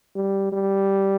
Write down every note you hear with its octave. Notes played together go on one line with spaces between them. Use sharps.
G3
G3